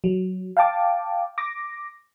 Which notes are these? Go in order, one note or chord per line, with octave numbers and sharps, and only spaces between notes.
F#3
F5 G5 A5 D6
D6 A#6